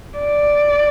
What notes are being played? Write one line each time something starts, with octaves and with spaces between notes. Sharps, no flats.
D5